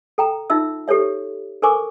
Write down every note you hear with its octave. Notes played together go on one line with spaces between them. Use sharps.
A4 G5 A#5
D#4 F4 E5 E6
G4 A4 C5 C#5 E5
A4 A#4 C5 G#5 C#6 D6